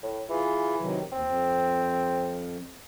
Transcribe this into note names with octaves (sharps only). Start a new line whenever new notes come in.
A2
E3 F4 G#4
C3 D#3 F#3
D#2 C4
F2